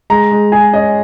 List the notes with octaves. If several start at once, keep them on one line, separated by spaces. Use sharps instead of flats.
G#3 A#5
G#3
G#4 G#5
C#4 D#5